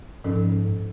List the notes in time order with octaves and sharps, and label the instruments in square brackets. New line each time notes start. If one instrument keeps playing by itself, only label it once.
[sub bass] G#2 [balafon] F3 C#4 A4